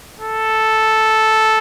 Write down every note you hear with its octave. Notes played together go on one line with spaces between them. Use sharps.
A4